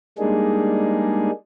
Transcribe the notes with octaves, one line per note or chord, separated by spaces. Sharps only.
G3 G#3 A#3 D4 D#4 G#4